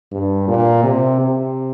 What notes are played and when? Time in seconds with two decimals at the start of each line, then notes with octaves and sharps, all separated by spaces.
0.12 G2
0.48 A#2
0.84 C3
1.20 C3